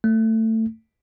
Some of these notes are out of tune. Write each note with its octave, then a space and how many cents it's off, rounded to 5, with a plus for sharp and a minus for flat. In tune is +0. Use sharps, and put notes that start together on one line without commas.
A3 +20